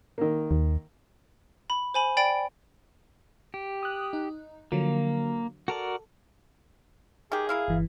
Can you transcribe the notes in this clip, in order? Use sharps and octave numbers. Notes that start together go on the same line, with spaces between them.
D#3 A#3
D#2
B5
C5 G#5 B5
D5 G5 B5 A6 D7
G4
D#6 F#6
D#4
D3 F3 F#3 A#3
F#4 A4 A#4 D5
D#3 G4 G#4
A#3 E4 F5
G1 E3